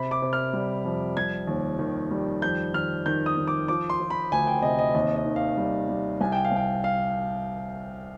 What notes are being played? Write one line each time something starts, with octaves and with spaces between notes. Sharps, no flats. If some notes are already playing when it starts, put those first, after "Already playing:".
Already playing: C3 B5
D6
C3
F6
G3
F2
G3 G#6
D#2
D#3
G3
F2 G6
D#3 F6
D#3 G6
D#6
D#3
D6
F3 D6
C6
F3
B5
D2 G#5
G5
C3 D#5
D#5
D#2 D#5
D#5
D#3
F5
G3
G3
C2 G#5
G5
F5
C2 G5
F5